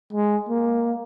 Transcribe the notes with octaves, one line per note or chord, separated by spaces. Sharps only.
G#3
A#3